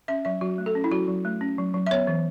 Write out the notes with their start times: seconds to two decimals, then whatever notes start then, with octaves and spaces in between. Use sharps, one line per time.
0.08 C#4 E5
0.25 F#3 E5
0.41 F#3 F#4
0.58 A3
0.66 A4
0.75 C#4
0.84 E4
0.91 F#3 F#4
1.08 F#3
1.25 A3
1.41 C#4
1.58 F#3
1.74 F#3
1.86 E5
1.91 B3 C#5
2.07 E3